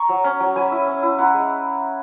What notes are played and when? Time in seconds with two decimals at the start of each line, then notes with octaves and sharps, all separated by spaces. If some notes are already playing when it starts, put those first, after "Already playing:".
Already playing: A#5 C#6
0.09 F#3
0.24 C#4
0.40 F#3
0.56 F#3 G#5 B5
0.71 E4
0.86 C#4
1.03 E4
1.18 E4 F#5 A#5
1.34 G#3